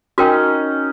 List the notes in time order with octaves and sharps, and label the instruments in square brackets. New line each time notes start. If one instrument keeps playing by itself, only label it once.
[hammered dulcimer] C#4 D#4 [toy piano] F#4 A#4 G5